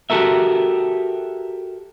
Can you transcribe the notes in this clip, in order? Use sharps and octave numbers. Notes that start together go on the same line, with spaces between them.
F#4 G4 A4 A#4 E5